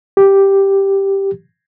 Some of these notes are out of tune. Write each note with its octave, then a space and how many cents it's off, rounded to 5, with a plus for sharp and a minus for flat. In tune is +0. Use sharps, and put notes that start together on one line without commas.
G4 +0